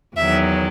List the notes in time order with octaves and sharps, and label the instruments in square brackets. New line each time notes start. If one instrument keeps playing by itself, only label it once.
[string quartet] E2 D#3 F#3 E5